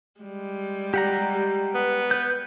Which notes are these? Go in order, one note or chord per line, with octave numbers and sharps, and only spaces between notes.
G3 G#3
G4 F#5 A#5
B3
B4 G6